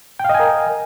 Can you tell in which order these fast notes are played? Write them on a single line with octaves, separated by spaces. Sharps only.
G5 F5 D#5 G#5 A#4